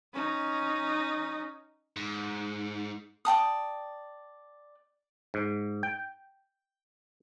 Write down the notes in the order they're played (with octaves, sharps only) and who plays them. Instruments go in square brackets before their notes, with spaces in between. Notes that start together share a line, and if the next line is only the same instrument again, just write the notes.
[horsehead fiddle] C#4 D#4
[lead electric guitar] G#2
[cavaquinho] D5 G5 A5 D#6
[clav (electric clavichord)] G#2
G5